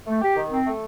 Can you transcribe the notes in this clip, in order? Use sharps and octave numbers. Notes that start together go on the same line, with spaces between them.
A3
G4
D#3
C4
A3